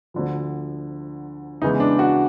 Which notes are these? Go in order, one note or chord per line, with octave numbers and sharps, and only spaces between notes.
D2 D3 F3
C#3 E3 G#3 B3 D#4
D4
F#4